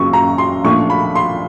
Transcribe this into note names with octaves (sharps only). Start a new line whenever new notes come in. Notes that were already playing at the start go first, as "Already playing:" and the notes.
Already playing: F#2 C#3 F#3 A#3 C#6
A#5
C6
A#2 F3 A3 D4 C#6
B5
C6